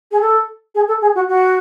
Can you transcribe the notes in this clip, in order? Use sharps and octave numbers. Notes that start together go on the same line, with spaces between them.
G#4
A4
G#4
A4
G#4
F#4
F#4